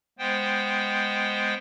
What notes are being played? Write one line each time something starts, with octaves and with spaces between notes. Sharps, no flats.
G#3 B3 C5 G5